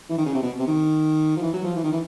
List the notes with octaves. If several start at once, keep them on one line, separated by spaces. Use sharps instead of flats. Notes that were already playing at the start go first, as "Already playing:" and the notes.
E3
D#3
C#3
C3
B2
C3
D#3
F3
E3
F#3
F3
E3
D#3
E3